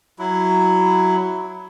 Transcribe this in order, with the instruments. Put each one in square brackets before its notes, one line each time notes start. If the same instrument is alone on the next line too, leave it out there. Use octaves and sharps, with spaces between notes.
[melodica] F#3 E4